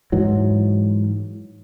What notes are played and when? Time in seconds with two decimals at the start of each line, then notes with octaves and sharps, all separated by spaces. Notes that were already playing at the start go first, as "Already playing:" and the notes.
0.12 G#2 E3 F#3